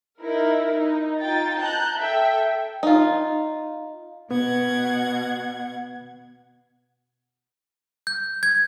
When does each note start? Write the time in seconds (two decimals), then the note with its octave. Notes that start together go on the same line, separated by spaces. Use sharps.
0.21 D#4 E4 A#4
0.71 D#4
1.22 D#4 F4 G5 A6
1.59 A5 A#5 F#6 G6
1.99 A4 E5 G5
2.83 D#4 F4
4.31 B2 B3 F#5 G#6
8.07 G6
8.43 G#6